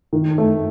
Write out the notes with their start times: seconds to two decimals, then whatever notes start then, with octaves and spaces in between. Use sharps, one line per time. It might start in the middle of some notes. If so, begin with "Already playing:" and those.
0.13 D#3
0.38 A3